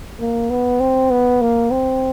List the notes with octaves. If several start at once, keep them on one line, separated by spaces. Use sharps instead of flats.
A#3
B3
C4
B3
A#3
C4